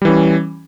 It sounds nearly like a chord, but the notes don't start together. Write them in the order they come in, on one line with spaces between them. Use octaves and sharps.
G3 E3 C#4